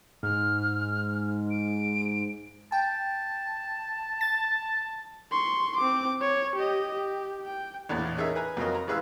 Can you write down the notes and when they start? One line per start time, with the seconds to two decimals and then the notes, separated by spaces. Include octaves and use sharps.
0.23 G#2 F6
1.50 D7
2.72 G5 A5
4.21 A6
5.31 C6 C#6
5.77 C4 D6
6.21 C#5
6.56 G4 D#5
6.94 G4
7.45 G5
7.89 A#1 E2 A2
8.17 C#4 D#4 G#4 A#4 E5
8.35 B4 G#5 A#5
8.57 F2 F#3 F#4 A#4 D#5
8.74 A#5
8.87 A1 G#3 G#4 B4 F5 E6